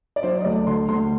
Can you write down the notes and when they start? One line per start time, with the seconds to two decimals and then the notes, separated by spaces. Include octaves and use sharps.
0.16 D5
0.23 F#3 C5
0.40 D#5
0.45 D2 D5
0.67 D3 C6
0.89 D2 C6